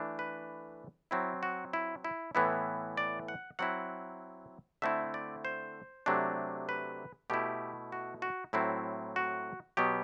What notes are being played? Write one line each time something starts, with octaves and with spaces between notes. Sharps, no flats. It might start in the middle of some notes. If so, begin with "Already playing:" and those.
Already playing: E3 A3 D4
B4
F#3 C4 E4
F#4
E4
E4
A2 E3 B3 E4
D5
F#5
F#3 C4 E4 F#5
D3 A3 C4 E4 E5
D5
C5
C3 F#3 A3 D4
B4
B2 A3 E4 G4
F#4
F#4
A2 F#3 C4 E4
F#4
B2 F#3 B3 G4